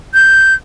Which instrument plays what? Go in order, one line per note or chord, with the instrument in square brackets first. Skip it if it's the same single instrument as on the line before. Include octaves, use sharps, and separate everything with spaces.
[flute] G6